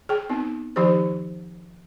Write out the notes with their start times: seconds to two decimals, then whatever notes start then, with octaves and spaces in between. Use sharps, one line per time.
0.09 G#4 G5
0.30 B3 C4 D#4
0.76 D#3 F3 D#4 G4 C5